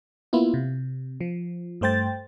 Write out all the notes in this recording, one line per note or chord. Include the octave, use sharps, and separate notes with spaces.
A#3 B3 E4 F4
C3
F3
G2 A3 C5 G5 A6